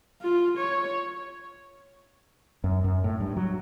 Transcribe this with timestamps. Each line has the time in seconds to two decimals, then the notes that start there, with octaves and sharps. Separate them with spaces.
0.22 F4
0.57 C#5
2.64 F#2
2.84 F#2
3.04 A2
3.20 G2
3.37 F#3